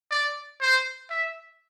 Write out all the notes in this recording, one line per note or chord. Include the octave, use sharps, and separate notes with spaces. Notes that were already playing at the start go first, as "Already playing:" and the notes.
D5
C5
E5